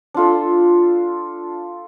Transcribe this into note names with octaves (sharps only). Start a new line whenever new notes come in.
D4 F4 A4